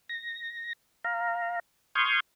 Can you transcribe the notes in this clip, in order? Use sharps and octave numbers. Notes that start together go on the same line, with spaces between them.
A#6
F5 A#5
C6 C#6 D#6 F6 G6 G#6